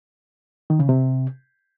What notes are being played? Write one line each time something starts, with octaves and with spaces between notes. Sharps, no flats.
D#3
C#3
C3